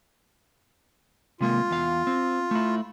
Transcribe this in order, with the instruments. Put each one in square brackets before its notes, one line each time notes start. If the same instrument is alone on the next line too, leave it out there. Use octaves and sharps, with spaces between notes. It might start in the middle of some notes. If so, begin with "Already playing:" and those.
[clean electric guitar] C3 G#3 A#3 [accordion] F4
[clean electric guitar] E2 F5
C4
A3 E4